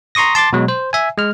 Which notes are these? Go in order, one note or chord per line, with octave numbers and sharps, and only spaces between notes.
A#5 C6 C#6 D#6 A#6
A5 C6 D6 A6
B2 F#3 G#3
C5
E5 G#5
G#3 F6